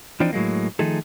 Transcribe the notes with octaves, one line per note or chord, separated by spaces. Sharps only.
E3 F3 C4 D4 D#4
A2 F#3 G#3 A#3
D#3 F3 A3 D#4 G#4 A4